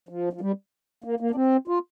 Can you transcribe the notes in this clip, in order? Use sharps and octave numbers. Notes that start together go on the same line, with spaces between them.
F3
F3
G3
A#3
A#3
D4
C4
F4